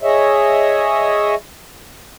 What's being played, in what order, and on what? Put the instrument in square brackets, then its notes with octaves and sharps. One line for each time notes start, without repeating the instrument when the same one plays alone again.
[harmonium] G#4 C#5 D#5 E5